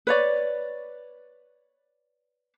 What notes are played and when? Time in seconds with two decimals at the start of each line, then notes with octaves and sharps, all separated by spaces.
0.07 B4 C#5 D5